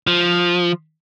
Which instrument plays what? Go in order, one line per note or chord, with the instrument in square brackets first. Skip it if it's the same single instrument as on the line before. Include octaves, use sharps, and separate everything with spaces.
[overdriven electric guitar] F3